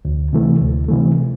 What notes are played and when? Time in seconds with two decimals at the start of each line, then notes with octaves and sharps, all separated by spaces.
0.05 D2
0.33 C3 E3 A3
0.61 D2
0.88 C3 E3 A3